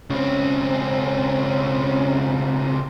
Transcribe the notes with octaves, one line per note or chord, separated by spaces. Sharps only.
C#2 C4 C#4